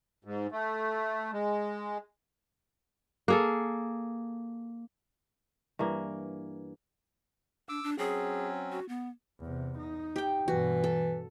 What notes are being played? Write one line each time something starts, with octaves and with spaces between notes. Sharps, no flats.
G#2
A3
G#3
A#3 G#4 A4
G2 E3 A#3
D4 D6 E6
D4
F#3 C4 C#4 G#4
F#4
B3
E2 C3
D#4
G4 G5
G2 B2 E3 F#4
A4